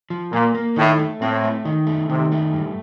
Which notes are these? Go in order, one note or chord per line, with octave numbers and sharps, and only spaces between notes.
F3
A#2 A#3
A#3
A2 D#3
A3
A2 C4
A3
D#3
A3
C3 D#3
A3
G2